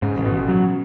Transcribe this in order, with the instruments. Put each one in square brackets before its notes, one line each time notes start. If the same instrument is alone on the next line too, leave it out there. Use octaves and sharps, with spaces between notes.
[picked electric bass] G#2 [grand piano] C#3
[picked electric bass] A1
[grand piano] B2
[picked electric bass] A1
[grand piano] C#3 [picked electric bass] F#3